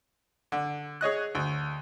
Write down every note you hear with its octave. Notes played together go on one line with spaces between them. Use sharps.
D3
G#4 C#5 D#5 F#6
D2